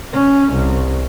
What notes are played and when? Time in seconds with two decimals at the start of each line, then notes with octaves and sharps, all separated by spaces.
0.13 C#4
0.52 C2